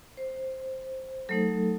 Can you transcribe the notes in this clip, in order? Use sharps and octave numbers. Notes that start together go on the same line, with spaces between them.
C5
F#3 A3 D#4 A4